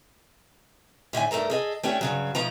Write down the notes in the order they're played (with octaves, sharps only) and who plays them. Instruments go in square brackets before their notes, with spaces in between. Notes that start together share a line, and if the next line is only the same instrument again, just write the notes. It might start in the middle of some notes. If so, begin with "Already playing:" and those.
[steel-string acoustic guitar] A2 D3 E5 G#5
G2 A3 A4 A#4 A#5
G#4 A4 D#5
A3 C#4 D4 G4
G2 C#3 F#3
B2 F3 A3 A#5